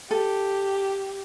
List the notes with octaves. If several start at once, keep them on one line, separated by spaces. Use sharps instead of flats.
G4 A4